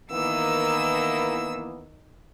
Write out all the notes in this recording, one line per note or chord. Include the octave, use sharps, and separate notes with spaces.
D#3 E3 A#3 B3 E6